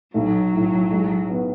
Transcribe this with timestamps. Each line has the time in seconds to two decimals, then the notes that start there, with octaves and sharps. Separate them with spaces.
0.14 B1 F#3
0.53 A2
0.91 G#3
1.29 B3